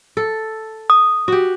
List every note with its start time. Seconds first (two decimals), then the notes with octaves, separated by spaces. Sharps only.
0.17 A4
0.90 D#6
1.28 F#4 G4